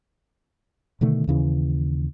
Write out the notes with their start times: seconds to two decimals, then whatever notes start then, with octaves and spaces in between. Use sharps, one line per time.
1.01 B2 D3 D#3 A3
1.28 D#2 C#3 E3